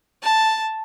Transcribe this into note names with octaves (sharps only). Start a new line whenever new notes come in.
A5